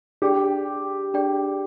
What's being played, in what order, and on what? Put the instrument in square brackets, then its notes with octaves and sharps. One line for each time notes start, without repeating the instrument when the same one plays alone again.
[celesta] D4 G#4 D5 G5 [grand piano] G4
[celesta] D4 G#4 D5 G5